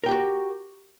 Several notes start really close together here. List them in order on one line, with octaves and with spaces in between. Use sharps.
A#4 G5 G4 F#4